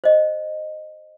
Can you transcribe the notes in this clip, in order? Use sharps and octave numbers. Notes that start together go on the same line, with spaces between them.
C5 D#5